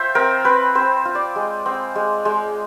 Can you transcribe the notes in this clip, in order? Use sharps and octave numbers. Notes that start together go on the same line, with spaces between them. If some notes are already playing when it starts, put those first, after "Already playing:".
Already playing: F4 C5 E5 G5
C4 A#4
C4 B4
C4 C5
F4
D5
G#3
C4
G#3
G#3